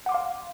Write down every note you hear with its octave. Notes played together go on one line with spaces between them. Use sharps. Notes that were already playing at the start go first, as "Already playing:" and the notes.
F5 F#5 C6 D6